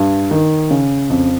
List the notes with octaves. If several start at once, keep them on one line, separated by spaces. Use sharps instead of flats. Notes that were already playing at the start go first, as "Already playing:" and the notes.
Already playing: G2
D#3
C#3
F2